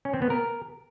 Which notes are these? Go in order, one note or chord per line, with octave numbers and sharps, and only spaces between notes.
C#4
C4
B3
A#4